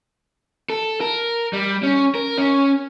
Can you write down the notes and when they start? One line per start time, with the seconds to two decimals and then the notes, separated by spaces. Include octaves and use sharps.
0.70 A4
1.01 A#4
1.53 G3
1.83 C#4
2.15 A#4
2.38 C#4